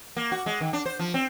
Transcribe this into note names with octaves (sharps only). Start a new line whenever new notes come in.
A#3
F#4
G#3
D#3
D4
C5
F3
C4